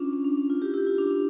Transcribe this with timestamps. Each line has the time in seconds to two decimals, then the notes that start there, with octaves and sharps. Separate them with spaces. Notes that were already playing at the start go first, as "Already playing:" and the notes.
Already playing: C#4 D4 F4
0.13 C#4
0.24 D4
0.37 D4
0.50 F4
0.61 E4 G4
0.74 E4 G4
0.87 F4
0.98 D4
1.11 D4